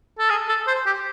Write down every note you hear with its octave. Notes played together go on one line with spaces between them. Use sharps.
A4
G#4
A4
C5
G4